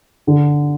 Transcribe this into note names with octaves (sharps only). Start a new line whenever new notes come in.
D3